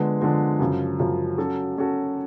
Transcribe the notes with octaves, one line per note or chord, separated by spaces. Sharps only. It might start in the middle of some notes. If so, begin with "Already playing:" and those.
Already playing: D3 F3 G#3 B3
D3 F3 G#3 B3
F#2 C#3 F3
F#2 C#3 F3
F#3 C#4 F#4 A4
F#3 C#4 F#4 A4